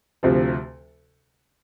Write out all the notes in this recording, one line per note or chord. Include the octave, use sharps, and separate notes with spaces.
D2 C3 F3